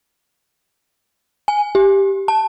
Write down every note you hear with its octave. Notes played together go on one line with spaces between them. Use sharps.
G#5
G4
A5